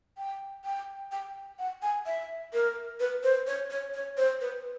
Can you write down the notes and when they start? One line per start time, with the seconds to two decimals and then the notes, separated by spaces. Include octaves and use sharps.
0.18 G5
0.65 G5
1.12 G5
1.59 F#5
1.82 G#5
2.06 E5
2.53 A#4
3.00 B4
3.23 C5
3.47 C#5
3.70 C#5
3.94 C#5
4.17 C5
4.41 B4